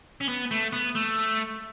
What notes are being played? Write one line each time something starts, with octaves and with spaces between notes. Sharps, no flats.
C#4
B3
A3
B3
A3